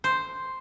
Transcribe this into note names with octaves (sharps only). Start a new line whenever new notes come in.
C5